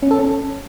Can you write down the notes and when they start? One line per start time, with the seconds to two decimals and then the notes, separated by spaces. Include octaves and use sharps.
0.03 C#4
0.11 A4
0.19 C#4